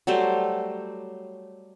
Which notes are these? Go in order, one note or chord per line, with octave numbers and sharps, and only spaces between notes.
F#3 G3 A3 C5